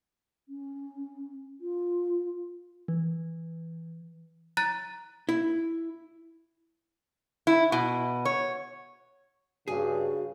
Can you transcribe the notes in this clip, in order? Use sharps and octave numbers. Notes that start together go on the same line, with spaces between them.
C#4
F4
E3
A#5 F#6 A6
E4
E4
B2
C#5
G2 C#3 F#4 G#4